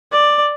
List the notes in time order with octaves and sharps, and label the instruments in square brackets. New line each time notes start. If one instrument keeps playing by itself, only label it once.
[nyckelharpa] D5